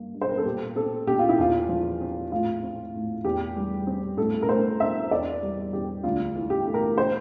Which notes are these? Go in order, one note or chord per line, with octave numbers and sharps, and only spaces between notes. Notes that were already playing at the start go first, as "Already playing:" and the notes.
Already playing: G2 A#3
G2
C5
A#4
A4
A#2 G4
C4 A4
A#2 G4
F4
E4
E2 F4
F3
C4
A2 F4
C4
A2
E2 G4
G3
C4
A2 A4
A#4
A3 C5
C4 E5
E2 D5
G3
E2 G4
D2 F4
E3
G4
A3
A#4
C5